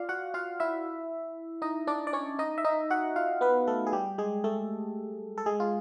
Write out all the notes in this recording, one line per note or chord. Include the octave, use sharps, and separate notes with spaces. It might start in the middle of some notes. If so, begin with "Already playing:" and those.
Already playing: F4 D5 F5
F#4 F#5
F4 F5
E4 E5
D#4 D#5
D4 D5
D5
C#4 C#5
D#4 D#5
E5
D#4 D#5
F#4 F#5
F4 F5
B3 B4
A3 A4
G#4
G3 G4
G#3 G#4
A3 A4
A4
G#3 G#4
F4